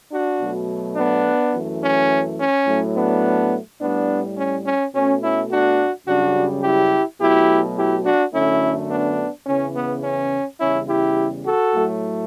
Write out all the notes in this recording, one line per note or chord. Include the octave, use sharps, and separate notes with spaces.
D4 F#4
B2 F#3 A3
B3 D4
F#2 E3 A3
C#4
C#4
A2 F#3 A3
B3 D4
A2 G3 B3 D4
C#4
C#4
B2 A3 C#4
C#4 E4
D4 F#4
F#2 C#3 G3 D4 F#4
E4 G4
B2 F#3 A3 E4 G4
E4 G4
D4 F#4
F#2 D3 A3 C#4 E4
B3 D4
E2 C#3 E3 C#4
B3
C#4
E2 C#3 G3 C#4 E4
E4 G4
F#4 A4
A2 F#3 A3